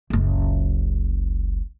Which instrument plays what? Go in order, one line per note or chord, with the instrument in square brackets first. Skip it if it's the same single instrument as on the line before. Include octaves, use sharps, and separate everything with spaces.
[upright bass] F#1 C#2